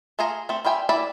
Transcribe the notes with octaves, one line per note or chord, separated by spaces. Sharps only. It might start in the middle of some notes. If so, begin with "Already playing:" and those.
A3 F4 G#4 G#5 A#5
A3 C4
G3 F4 E5 G5 G#5
E3 E4 D5 E5 B5